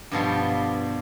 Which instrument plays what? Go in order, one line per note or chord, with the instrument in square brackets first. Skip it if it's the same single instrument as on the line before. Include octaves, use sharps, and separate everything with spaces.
[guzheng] G2 B2 F3 G3